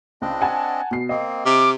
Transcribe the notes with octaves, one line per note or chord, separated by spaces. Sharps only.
C#2 C4 D4 D#5
F#5 G#5 A5
B2 C7
A#3 C4 D#5
C3 D6 F6